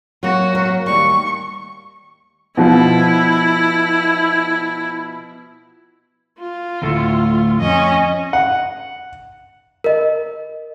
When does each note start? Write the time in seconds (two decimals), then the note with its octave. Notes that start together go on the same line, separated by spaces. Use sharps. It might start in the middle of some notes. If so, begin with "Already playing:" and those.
0.23 F#3 A#3 C#4 F#4
0.55 F#3 A#3 A#4
0.86 D#2 G3 C#6
2.57 B2 F3 E4
6.39 F4
6.82 D2 A2 A3
7.60 F2 C#4 D#5
8.33 F#5
9.84 A#4 D#5